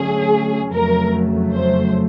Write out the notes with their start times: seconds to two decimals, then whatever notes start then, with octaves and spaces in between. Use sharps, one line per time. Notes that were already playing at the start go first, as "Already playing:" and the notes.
Already playing: D3 F#3 A3 C#4 G#4
0.73 F2 C#3 F#3 A3 A#4
1.53 C5